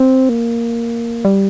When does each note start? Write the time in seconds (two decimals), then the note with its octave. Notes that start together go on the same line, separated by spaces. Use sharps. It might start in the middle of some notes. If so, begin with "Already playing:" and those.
Already playing: C4
0.29 A#3
1.25 G3